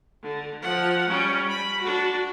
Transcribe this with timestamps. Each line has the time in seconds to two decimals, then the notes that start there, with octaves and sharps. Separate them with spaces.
0.23 D3
0.62 F3 F#5
1.09 G3 C#4
1.49 B5
1.81 D4 F#4